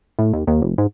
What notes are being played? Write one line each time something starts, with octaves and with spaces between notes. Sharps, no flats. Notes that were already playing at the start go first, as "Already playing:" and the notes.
A2
D#2
D#2
F1
G#2